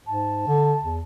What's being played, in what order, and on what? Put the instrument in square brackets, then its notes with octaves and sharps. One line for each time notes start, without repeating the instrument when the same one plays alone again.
[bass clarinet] G#2 [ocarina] A5
[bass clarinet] D3
E2